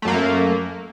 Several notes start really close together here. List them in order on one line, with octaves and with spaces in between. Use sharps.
A3 F#2 A#3